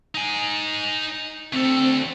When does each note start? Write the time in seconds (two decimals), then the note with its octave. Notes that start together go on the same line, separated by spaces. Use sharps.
0.15 D#4 G#5
1.53 D2 C4 A4